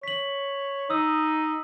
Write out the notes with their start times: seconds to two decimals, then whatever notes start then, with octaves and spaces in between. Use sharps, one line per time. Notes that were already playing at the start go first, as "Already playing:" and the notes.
0.03 C#5 B6 F#7
0.90 D#4 D#6 E6